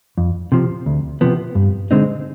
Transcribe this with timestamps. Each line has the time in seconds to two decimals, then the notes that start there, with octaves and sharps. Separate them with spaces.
0.18 F2
0.52 C3 F3
0.86 D2
1.21 C3 F3 B3
1.55 G2
1.91 D3 G#3 C4 D#4